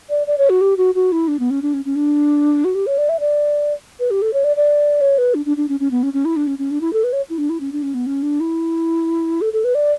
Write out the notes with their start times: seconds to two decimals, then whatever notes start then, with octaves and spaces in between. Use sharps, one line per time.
0.10 D5
0.27 D5
0.38 C#5
0.50 F#4
0.61 G4
0.77 F#4
0.95 F#4
1.12 E4
1.28 D4
1.40 B3
1.50 C#4
1.62 D4
1.74 C#4
1.85 C#4
1.96 D4
2.65 F#4
2.75 G4
2.87 C#5
2.98 D5
3.09 E5
3.20 D5
4.00 B4
4.11 G4
4.22 A4
4.33 C#5
4.44 D5
4.56 D5
5.01 C#5
5.18 B4
5.35 D4
5.46 D4
5.57 D4
5.69 C#4
5.80 C#4
5.91 B3
6.03 C#4
6.14 C#4
6.25 E4
6.36 D4
6.47 C#4
6.59 C#4
6.71 D4
6.81 E4
6.93 A4
7.04 B4
7.13 C#5
7.30 E4
7.38 D4
7.50 E4
7.60 C#4
7.72 D4
7.83 C#4
7.94 B3
8.06 C#4
8.23 D4
8.40 E4
9.41 A4
9.53 A4
9.64 B4
9.75 D5